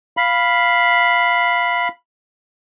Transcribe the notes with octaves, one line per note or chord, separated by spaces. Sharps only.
F5 B5